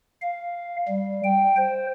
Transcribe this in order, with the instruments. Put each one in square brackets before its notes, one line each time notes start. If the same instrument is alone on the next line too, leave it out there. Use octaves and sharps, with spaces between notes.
[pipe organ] F5
G3
G5
C5